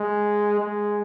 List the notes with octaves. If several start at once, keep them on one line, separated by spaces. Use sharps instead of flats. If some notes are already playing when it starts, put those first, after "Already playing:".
Already playing: G#3
G#3